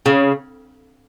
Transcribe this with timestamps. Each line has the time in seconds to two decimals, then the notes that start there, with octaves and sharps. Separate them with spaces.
0.06 C#3